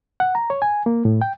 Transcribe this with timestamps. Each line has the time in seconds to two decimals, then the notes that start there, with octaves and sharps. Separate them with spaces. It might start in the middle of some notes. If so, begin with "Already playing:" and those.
0.20 F#5
0.35 A#5
0.50 C#5
0.62 G#5
0.86 A#3
1.05 A2
1.21 G5